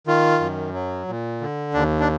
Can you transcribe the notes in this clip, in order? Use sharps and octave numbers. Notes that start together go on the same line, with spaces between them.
D#3 F4
F#2
F#3
A#2
D3
D#2 D4
D4